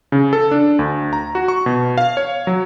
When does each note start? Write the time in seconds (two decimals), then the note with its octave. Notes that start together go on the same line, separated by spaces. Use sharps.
0.12 C#3
0.33 A4
0.51 D4
0.79 D2
1.13 A#5
1.35 F#4
1.48 C#6
1.66 B2
1.98 F5
2.17 C#5
2.47 F#3